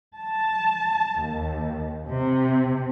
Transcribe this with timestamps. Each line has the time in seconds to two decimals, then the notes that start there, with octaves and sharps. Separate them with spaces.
0.18 A5
1.22 D#2
2.07 C3